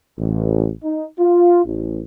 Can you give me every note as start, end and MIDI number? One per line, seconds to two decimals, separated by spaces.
0.19 0.69 33
0.83 1.06 63
1.19 1.63 65
1.65 2.02 33